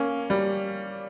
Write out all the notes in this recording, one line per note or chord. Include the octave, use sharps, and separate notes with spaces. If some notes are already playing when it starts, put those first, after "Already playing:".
Already playing: A#3 C#4
G3